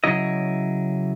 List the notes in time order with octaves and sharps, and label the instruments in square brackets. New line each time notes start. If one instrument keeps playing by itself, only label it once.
[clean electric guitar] C#3 F#3 E4 D#5